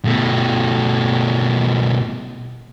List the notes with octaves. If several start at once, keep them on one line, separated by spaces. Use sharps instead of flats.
B2 A3